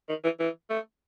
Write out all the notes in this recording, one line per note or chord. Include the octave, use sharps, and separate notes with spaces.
D#3
E3
E3
A3